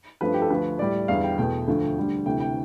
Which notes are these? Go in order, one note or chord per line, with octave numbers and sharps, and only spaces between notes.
G2 F3 A3 B4
G4
A4
D2 D3 F3 A3 B4
A2 G3 D5
E2 D3 G3 F5
G5
E2 B2 A3 G5
D2 D3 F3 A3
D2 D3 G3
D2 C3 E3 A3 G5
G5